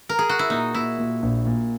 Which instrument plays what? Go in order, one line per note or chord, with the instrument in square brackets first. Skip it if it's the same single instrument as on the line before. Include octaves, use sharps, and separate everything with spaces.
[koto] A#4
G#4
F#4
E4
[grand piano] A#2 [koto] D#4
[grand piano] A#2 [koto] E4
[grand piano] A#2
A#1
A#2